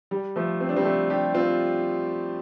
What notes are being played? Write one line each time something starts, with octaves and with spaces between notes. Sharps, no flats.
G3
F3 A3
C4
D4
G3 C4
A3 D4
D4 G4
C4 F4